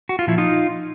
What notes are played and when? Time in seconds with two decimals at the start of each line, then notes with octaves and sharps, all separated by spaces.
0.09 F#4
0.19 F4
0.27 A#2 F3 E4
0.38 D#4 F4